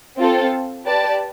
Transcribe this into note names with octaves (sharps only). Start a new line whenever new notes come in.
C4 F4 A4
G4 B4 D5 A5